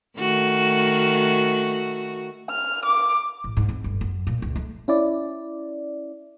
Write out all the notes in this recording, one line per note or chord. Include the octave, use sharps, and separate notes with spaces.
D#3 A3 F#4
F6
D6
A1
G#2
C4
G1
F#2
A#2
C#2
A3
C#4 E4 D5